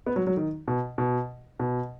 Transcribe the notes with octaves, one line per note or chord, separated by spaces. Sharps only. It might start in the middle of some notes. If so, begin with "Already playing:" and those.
B3
F#3
F#3
D#3
B2
B2
B2